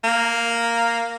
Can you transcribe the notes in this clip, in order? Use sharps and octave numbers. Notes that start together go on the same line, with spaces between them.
A#3